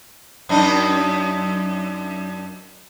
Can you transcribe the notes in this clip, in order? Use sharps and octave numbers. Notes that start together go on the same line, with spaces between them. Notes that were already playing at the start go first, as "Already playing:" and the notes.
F#2 D4 D#4